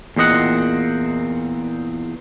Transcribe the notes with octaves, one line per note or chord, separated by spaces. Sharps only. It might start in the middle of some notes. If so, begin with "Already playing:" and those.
E2 A#2 C4 D#5 F#5